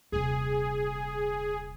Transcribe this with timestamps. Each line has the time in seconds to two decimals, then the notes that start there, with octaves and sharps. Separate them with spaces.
0.12 D#1 C3 G#4